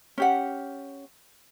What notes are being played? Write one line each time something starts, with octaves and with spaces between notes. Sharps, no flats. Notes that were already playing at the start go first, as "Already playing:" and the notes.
C#4 G4 F#5